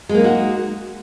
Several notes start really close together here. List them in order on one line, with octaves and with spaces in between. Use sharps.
G#3 A#3 D#4 F#4